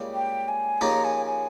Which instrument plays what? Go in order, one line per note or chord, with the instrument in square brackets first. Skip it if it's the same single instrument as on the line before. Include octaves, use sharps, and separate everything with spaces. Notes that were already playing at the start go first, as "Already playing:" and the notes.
Already playing: [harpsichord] C#2 C#3 G3 A#3
[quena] G5
G#5
[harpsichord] D#2 C#3 F3 A#3 C#4 [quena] A#5
[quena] G#5
G#5